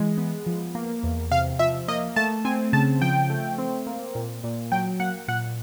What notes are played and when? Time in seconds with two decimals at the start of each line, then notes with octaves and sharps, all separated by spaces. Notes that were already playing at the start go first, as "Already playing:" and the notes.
Already playing: E3 G#3
0.18 B3
0.46 F3
0.75 A#3
1.03 E2
1.31 C3 F5
1.59 F3 E5
1.88 A#3 D#5
2.16 A3 A5
2.45 C4 G#5
2.73 C#3 A5
3.01 F3 G5
3.30 A3
3.58 C4
3.87 A#3
4.15 A#2
4.44 A#2
4.72 F#3 G5
5.00 A#3 F#5
5.28 A#2 F#5